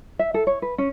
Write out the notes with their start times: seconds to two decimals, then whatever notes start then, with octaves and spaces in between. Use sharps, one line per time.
0.19 E5
0.34 A4
0.47 C#5
0.62 B4
0.78 C#4